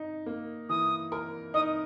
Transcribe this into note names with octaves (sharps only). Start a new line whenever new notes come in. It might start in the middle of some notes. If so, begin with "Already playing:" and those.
Already playing: D#4
A#3
E3 D#6
A#4
D#4 D#6